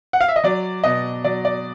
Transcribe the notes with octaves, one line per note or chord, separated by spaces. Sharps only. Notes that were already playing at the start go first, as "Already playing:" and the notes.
F#5
F5
E5
D#5
F#3 D5
B2 D#5
F#3 D5
D5